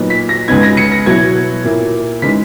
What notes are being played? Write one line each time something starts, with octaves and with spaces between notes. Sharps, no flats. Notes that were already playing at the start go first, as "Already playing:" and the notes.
Already playing: A#2 F#3 B3 D#4
B6
A#6
C#2 C#3 G#3 B3 D#4 G#6
A#6
C#7
A#6
B2 F#3 B3 E4 G#6
A#2 A#3 E4
C#3 E3 G#3 D#4 B6